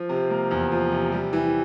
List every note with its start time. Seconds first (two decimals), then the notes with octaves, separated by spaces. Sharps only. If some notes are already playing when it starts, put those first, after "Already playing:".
Already playing: F3
0.09 C3
0.30 A#3
0.51 E2
0.72 F3
0.91 C3
1.12 G3
1.33 E3